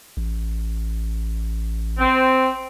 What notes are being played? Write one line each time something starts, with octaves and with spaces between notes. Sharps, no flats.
A1
C4